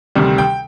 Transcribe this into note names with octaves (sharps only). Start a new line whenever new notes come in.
D2 C3 D#3 G3
G5